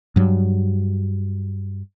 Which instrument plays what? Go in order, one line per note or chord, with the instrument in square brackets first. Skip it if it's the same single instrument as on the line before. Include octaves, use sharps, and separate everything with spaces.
[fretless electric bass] G2 F#3